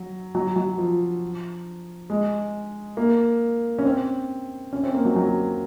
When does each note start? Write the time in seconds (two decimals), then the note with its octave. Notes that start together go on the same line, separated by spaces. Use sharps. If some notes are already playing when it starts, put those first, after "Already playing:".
Already playing: F#3
0.35 F#3
0.56 F#3
0.78 F3
2.10 G#3
2.97 A#3
3.79 C#4
3.85 C4
4.73 C#4
4.84 C4
4.94 A#3
5.05 F#3
5.16 F#3